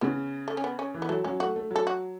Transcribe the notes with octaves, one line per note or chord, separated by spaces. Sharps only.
C#3 B3
A3
C#4
B3
C#4
E3
B3
F#3 A3
F#3 C#4
A3 F#4
A3
F#3 A4
F#4